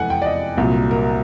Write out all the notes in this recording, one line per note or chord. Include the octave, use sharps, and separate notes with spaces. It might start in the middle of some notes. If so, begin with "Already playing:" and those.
Already playing: F1 E2 E3 G#3 A4 F#5 G#5
G5
D5
D#5
C2 A#2 F#3
A#4